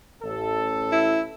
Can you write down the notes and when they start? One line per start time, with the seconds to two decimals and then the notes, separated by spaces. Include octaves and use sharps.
0.23 A1 A4
0.92 E4